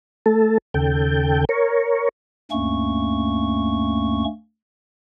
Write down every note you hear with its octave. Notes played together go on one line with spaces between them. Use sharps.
A3 A4
D#2 C#3 A4 G5
A#4 C#5
D2 G2 A3 A#3 C#4 C#6